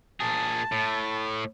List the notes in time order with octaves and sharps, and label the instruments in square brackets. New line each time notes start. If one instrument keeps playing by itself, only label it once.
[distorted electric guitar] A#2 G#4 [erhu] A5
[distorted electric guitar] A2